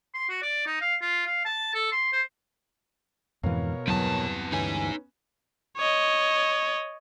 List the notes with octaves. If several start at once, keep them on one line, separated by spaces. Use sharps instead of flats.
C6
F#4
D5
D#4
F5
F4
F5
A5
A4
C6
C5
F2 G#2 B2 E3 A#4 C#5 F5
E2 G2 C3 F#3 A5
D2 G2 E3 B3 C#4 D#4 G#5
C#5 D#5